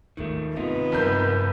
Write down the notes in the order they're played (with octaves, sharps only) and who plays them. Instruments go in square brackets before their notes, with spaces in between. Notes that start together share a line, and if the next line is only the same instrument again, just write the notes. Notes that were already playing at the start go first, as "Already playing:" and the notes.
[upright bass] D#2 G#2 [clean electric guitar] D#3 A3
[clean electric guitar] C3 D#4 F4 [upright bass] D#3 [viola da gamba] B3
[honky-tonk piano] F#1 A#4 G6 [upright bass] G2